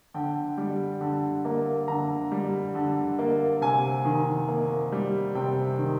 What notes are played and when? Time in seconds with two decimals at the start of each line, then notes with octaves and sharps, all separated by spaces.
0.14 D3 G5
0.58 G3
1.01 D3
1.45 A#3
1.88 D3 A#5
2.32 G3
2.75 D3
3.19 A#3
3.61 C3 G#5
4.05 D#3
4.48 A#3
4.92 G3
5.35 C3 G5
5.78 D#3